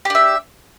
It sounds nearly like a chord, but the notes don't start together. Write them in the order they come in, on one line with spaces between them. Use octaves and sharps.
G4 D4 E5